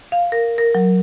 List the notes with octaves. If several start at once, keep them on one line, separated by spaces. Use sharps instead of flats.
F5
A#4
A#4
F#3